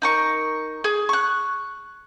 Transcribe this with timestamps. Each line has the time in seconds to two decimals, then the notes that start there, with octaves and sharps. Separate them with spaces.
0.02 D#4 A#4 C#6
0.84 G#4
1.09 C#6 F#6